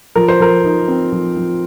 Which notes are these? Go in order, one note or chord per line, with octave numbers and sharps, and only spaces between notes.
F3 A#4
C5
F3 A#4
D#4
C4
F3
F3